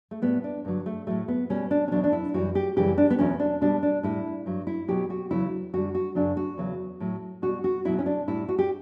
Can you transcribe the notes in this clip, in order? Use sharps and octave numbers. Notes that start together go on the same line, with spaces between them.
A3
A2 G3 B3
D4
G2 D3 F#3
A3
A2 F#3 A3
B3
B2 G3 C#4
D4
C#4
E2 B2 F#3 D4
D4
E4
F#2 E3 G3 F#4
G4
F#2 C#3 E3 G3 G4
D4
B3
E2 B2 F#3 C#4
D4
B2 G3 D4
D4
A2 G3 E4
G2 F#3
E4
B2 F#3 G4
F#4
E2 C#3 F#3 E4
F#2 D3 G3 F#4
F#4
F#2 C#3 F#3 D4
F#4
E2 C#3 F#3
A2 F#3
B2 G3 F#4
F#4
B2 F#3 E4
C#4
D4
A2 G3 E4
F#4
G4